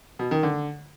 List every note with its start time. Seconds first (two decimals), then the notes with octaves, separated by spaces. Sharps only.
0.19 B2
0.31 D#3
0.43 D3